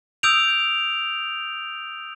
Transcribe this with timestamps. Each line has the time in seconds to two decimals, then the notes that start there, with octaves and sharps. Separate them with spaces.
0.23 D#6 E6 G6 D7 F7